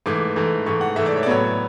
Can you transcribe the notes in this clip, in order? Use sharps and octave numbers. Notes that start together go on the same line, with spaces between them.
G#2 E3 A3 D6
G#2 E3 A3
G#2 E3 A3 C#6
F#5
G#2 E3 A3 E5
D5
C#5
D5
A2 F#3 B3 C#5